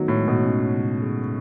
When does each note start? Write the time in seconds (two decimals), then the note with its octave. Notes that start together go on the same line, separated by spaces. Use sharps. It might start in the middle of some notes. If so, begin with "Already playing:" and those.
Already playing: D#3 F#3 A3 B3 D#4
0.08 A2
0.18 G#3
0.28 B2
0.47 C#4
0.74 C#3
1.02 G#4